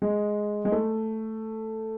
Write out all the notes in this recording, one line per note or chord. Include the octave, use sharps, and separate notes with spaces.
G#3
G#3
A3